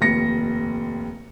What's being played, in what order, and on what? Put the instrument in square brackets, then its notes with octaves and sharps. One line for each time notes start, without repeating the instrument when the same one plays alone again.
[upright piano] F1 D#2 A#6 C#7